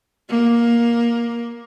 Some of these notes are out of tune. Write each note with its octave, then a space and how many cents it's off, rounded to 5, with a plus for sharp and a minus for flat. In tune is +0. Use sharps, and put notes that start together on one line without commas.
A#3 +10